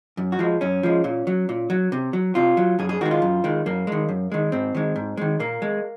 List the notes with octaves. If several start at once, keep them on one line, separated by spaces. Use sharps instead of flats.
F#2
F#4
F3 G#3
F#2 C#4
F3 G#3
A#2
F#3
A#2
F#3
C3
F#3
C3 F4
F#3
F#2 G#4
G#4
D#3 G#3 F#4
F4
F#2
D#3 G#3
F#2 A#3
D#3 G#3
F#2
D#3 G#3
G#2 C4
D#3 G#3
G#2
D#3 G#3
A#2 A#3
G#3